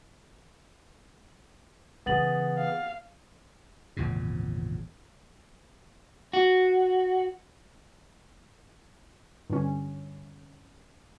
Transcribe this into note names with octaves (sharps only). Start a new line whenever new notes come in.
C#3 E3 B3 G#4 F#5 A6 F#7
F5
G#1 E2 A#2 C#3
F#4
G2 D3 C#4